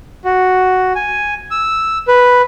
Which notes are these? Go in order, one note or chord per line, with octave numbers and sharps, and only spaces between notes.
F#4
G#5
E6
B4